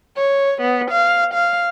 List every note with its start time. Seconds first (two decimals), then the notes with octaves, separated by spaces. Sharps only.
0.17 C#5
0.62 B3
0.91 F5
1.34 F5